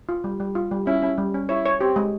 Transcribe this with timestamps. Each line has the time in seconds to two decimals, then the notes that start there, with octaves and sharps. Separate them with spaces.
0.09 F4
0.24 G3
0.40 G3
0.55 F4
0.71 G3
0.86 C#4 E4
1.03 C#4
1.18 G3
1.34 C#4
1.49 E4 C#5
1.66 C#5
1.81 C4 G4
1.96 G#3